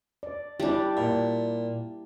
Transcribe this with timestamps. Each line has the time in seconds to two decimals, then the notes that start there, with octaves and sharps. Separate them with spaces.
0.23 D5
0.60 G3 D4 E4 D5
0.97 A#2